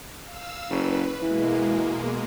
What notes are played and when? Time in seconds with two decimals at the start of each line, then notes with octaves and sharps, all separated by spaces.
0.24 F5 E6
0.70 F#1 B4
1.22 B2 E3 G#3 A#3